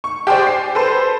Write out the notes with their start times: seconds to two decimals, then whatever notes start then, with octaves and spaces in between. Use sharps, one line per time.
0.04 C#6
0.27 G4 G#4 C5 D5
0.47 C7
0.75 A4 B4 C5